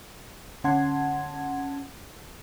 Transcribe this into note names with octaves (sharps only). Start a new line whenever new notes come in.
D3 C#4 F#5 A5 C6 G#6